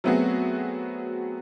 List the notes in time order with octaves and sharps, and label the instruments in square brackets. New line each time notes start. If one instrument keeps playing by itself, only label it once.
[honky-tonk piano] F#3 A3 B3 C4 F#4 G#4